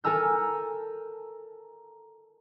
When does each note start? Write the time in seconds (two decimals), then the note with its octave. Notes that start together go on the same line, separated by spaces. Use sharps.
0.04 A4 A#4 G#5 A#5 E6 G6